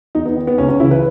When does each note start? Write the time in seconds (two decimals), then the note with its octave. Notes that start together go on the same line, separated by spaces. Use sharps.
0.15 E2 D#4
0.25 B3
0.37 D#3
0.47 B3
0.58 C#2 C#4
0.69 C#4
0.80 C#3 E3 E4
0.91 B4